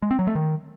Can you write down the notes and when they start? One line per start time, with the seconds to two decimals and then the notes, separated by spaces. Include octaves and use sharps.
0.02 G#3
0.11 C4
0.19 F#3
0.27 A3
0.35 D#3